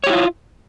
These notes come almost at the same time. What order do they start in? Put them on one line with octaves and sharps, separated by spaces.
C#5 G4 E4 F4